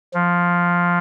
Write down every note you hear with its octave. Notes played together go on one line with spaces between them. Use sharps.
F3